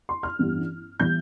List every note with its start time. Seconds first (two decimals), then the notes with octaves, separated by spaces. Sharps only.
0.09 C6
0.23 F6
0.39 A1 G2 E3 G3 B3
1.00 E3 G3 B3 G6